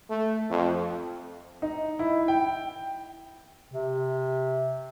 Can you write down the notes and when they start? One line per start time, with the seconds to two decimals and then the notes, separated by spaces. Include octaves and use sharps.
0.10 A3
0.50 F2
1.62 D#4
1.99 E4
2.28 G5
3.73 C3